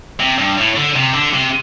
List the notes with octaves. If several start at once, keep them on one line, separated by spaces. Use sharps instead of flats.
C3
G2
A2
D3
C3
D3
C3